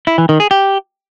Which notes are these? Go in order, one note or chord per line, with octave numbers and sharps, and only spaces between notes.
E4
E3
D#3
G#4
G4